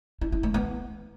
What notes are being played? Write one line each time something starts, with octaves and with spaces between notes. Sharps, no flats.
E4
E4
A3
B3